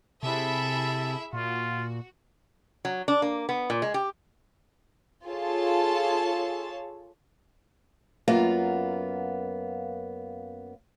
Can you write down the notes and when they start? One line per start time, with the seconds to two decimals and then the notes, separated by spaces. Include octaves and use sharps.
0.23 C3 E4 G#4 A4 E5
1.33 A#2 F4 F#4
2.85 F#3
3.08 D4
3.22 A#3
3.49 B3
3.70 A#2
3.82 G#3
3.94 G4
5.26 F4 G#4 A4 C#5 A5
8.28 F#2 A#3 B3 F4 F5